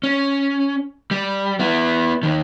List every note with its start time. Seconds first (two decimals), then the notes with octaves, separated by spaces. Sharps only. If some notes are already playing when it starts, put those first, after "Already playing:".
0.03 C#4
1.11 G3
1.59 B3 E4
2.23 D#2 D#3